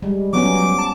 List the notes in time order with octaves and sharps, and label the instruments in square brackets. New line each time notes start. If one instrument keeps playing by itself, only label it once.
[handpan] G3 G#3
[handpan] F3 B3 C#4 [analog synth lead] F#3 [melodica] D6
[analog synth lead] A5